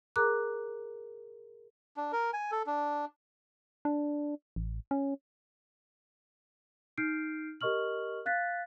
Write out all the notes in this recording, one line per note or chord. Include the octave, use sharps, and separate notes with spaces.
G#4 A#4 A#5 D6 F#6
D4
A#4
G#5
A4
D4
D4
A1
C#4
D#4 F6 G6 C7 D7
G4 A#4 D#5 C#6 F6 F#7
F5 F#6 A6 B6